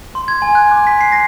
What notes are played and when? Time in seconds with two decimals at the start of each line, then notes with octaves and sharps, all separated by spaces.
0.15 C6
0.28 G#6
0.42 G#5
0.55 F#6
0.72 D6
0.87 B6
1.01 C7
1.12 A#6